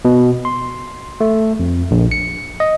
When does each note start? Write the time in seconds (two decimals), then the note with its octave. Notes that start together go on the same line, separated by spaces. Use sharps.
0.05 B2
0.45 C6
1.21 A3
1.59 F2
1.91 A#1
2.11 C#7
2.60 D#5